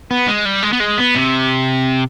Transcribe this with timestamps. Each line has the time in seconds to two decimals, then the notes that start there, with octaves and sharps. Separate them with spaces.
0.11 B3
0.28 G#3
0.45 G3
0.63 G#3
0.73 B3
0.80 G#3
0.98 B3
1.15 C3